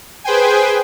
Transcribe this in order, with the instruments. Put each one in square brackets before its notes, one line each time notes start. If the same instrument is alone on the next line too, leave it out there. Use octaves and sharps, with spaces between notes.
[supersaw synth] G#4 B4 C5 G5 G#5